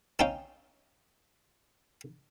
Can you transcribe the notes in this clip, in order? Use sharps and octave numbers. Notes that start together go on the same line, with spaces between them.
C4 C#4 D#4 F5 G5